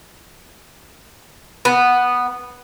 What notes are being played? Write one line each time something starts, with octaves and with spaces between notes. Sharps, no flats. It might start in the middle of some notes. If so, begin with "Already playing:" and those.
B3